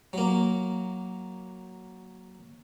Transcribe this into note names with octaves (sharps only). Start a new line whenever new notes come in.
F#3 A#3